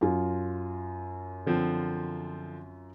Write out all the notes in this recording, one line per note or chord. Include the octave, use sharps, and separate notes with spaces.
F#2 F4
D3 F3 C4